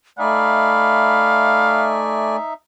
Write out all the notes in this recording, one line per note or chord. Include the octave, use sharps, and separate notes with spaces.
A3 D#4 D5 E5 F5 G#5 B5